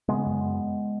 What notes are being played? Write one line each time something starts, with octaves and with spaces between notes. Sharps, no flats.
C#3 G#3 B3
F#2